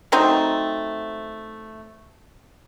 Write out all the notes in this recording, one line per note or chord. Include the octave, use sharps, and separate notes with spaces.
F#3 A3 C4 D#4